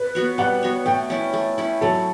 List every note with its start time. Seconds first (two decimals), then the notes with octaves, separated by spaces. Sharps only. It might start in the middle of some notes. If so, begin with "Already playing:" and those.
Already playing: B4
0.15 B3 F#4 C#5
0.38 G3 F#5
0.63 B3 F#4 C#5
0.86 A3 G5
1.10 C#4 E4
1.34 A3
1.58 C#4 E4
1.81 F#3 A4